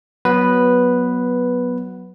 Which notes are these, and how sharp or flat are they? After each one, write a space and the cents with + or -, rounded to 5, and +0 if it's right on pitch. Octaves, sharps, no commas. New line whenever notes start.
F#3 +0 B3 -5 B4 +0